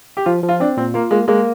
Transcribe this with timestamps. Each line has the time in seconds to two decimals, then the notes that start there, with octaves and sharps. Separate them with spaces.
0.17 G4
0.26 F3 F4
0.43 F3
0.49 F4
0.60 C4 D4
0.77 A#2 C4
0.94 A#3 F4
1.11 G#3 A#3
1.28 G#3 A#3